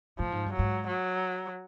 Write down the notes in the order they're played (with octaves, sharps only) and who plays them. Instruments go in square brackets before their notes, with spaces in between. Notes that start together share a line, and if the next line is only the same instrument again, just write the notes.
[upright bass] A2 [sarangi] F3
[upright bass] G#2
G2
[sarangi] F#3
[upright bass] G#2
[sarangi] F#3